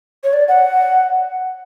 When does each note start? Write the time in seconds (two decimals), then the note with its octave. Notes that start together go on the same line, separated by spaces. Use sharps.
0.24 C#5
0.33 D5
0.48 F#5